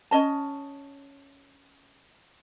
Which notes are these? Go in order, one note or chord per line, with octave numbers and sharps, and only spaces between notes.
C#4 D#5 A5